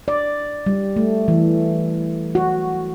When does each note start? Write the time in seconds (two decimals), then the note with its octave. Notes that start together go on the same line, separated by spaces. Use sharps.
0.08 D5
0.66 G3
0.96 A3
1.28 E3
2.35 F#4